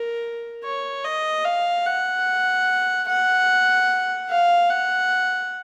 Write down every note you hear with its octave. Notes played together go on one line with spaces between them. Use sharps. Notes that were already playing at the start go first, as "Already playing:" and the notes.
Already playing: A#4
C#5
D#5
F5
F#5
F#5
F5
F#5